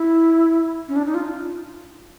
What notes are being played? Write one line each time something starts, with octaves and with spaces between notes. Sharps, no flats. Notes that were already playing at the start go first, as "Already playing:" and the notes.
Already playing: E4
C#4
D4
D#4
F4